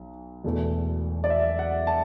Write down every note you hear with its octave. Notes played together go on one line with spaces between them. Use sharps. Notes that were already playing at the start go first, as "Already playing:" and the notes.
Already playing: B1
E1 E2 B2 A3
D5
E5
F#5
A5